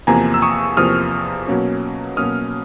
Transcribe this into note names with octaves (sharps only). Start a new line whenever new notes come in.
E2 C3 F3 A#3 G#5 A#5
E6
C#6 D#6
E2 C3 F3 A#3 D#6 F6
B2 F#3 A#3 C#4
B2 F#3 A#3 C#4 D#6 F6